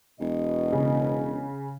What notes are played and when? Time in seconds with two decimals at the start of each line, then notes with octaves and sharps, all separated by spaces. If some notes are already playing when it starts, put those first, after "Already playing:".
0.20 E1 B2 D#5
0.72 C#3